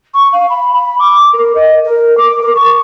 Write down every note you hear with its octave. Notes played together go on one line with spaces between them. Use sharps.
C#6
F5
B5
B5
D6
A#4
D#5
A#4
D6
A#4
C#6